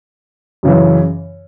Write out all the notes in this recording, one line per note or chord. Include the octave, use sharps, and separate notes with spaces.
F#2 C#3 E3